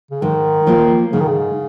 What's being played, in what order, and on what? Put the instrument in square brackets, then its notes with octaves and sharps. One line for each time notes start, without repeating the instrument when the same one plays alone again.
[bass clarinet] C#3
[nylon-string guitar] G#2 [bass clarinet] D#3
[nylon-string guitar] F3 A#3 F4
[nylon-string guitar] G#2 [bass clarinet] C#3
[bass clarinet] D#3
C#3